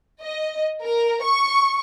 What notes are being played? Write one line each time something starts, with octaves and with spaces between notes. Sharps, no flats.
D#5
A#4
C#6